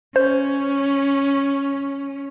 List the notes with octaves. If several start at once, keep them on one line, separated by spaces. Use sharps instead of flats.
C#4 C5